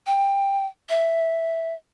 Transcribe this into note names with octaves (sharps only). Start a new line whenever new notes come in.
G5
E5